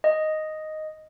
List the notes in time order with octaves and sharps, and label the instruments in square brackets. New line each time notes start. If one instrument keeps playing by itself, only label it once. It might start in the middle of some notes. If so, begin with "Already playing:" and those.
[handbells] D#5